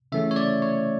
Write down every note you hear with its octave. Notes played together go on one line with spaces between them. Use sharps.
C#3 E3 A3 C#4 E5
C#5
D5
C#5